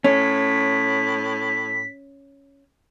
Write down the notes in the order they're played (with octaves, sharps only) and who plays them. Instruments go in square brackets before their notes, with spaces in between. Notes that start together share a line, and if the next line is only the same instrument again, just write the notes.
[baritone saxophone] A2 [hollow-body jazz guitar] C#4 [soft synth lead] B6